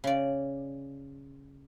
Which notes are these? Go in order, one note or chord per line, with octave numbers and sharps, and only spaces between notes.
C#3 D5